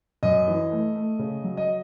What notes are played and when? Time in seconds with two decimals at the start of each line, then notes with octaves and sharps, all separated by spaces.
0.23 F#2 D#5
0.48 E3
0.72 A3
0.96 A3
1.19 C#3
1.44 F#3
1.57 D#5